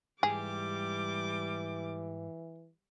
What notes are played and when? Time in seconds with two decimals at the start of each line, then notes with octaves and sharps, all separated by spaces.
0.23 G#2 E3 G3 G4 G#4 D6